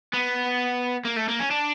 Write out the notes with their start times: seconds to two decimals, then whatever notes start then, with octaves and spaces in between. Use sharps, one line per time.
0.14 B3
1.05 A#3
1.17 A3
1.29 A#3
1.40 C#4
1.51 D4